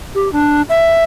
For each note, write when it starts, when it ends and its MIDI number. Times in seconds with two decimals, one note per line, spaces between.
0.15 0.31 67
0.33 0.62 62
0.69 1.04 76